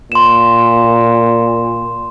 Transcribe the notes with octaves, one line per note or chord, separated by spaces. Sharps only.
A#2 C6 E7